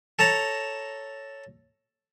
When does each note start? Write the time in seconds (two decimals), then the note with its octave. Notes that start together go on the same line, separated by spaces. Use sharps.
0.19 A4 C#5 A5 A#5